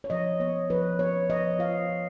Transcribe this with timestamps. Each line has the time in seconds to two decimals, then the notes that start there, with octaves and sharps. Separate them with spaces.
0.04 C#5
0.10 F3 D#5
0.40 B3 C#5
0.70 F3 B4
0.99 B3 C#5
1.30 F3 D#5
1.59 F4 F5
1.89 F3